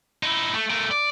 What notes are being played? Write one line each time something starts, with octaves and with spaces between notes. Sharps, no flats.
D#4 E4
A3
A3 A#4
D5